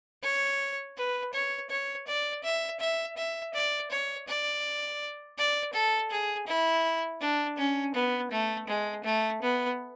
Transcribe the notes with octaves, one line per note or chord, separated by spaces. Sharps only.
C#5
B4
C#5
C#5
D5
E5
E5
E5
D5
C#5
D5
D5
A4
G#4
E4
D4
C#4
B3
A3
G#3
A3
B3